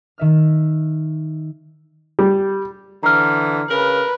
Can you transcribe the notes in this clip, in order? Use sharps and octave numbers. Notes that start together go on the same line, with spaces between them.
D#3 E5 F6
G3
D3 E3 A#5 F6
C#3 A#4 B4